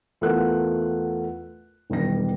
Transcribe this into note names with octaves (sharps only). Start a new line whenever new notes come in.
E2 A3 F4 A#4 F#5 F#6
E1 D#3 G3 A#6